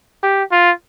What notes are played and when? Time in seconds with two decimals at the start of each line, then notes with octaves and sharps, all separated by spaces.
0.23 G4
0.52 F4